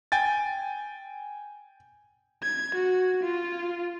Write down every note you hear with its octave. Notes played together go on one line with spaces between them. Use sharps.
G5 G#5 A6
G#6
F#4
F4